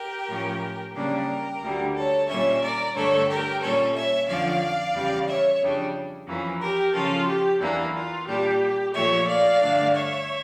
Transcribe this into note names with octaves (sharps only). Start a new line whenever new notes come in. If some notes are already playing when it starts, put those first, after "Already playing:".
Already playing: G4 A#4
A2 F3 C#4
C#3 G3 A#3 D4 G4 A#4
D2 D3 G3
A4 C#5
A#2 G3 C#4 C#5 E5
A#4 D5
G2 D3 A3 A4 C#5
G4 A#4
A#2 G3 C#4 A4 C#5
C#5 E5
F2 D3 F3 C#4 D5 F5
E2 C#3 G3
C#5 E5
F2 C#3 G3 D4
F2 E3 A#3 C#4
G4 A#4
C#3 F3 C#4 F4 A4
G4
E2 E3 A#3 D4
F4
A#2 G3 D4 G4
A#2 F3 A3 C#5 E5
D5 F5
G2 D3 A3 D4
C#5 E5